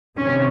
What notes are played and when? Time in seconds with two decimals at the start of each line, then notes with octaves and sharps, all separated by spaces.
0.17 C3 D#3 C#4